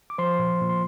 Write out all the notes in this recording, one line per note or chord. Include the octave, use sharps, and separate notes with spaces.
D6
F3 C5 C6
A#2
A#2
C6